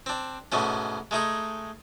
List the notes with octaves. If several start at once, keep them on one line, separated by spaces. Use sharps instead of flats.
C4 D4
G#2 B2 A3 C#4
G#3 A3 D#4 G#4